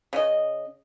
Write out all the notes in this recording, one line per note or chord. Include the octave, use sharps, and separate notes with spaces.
C#3 D#5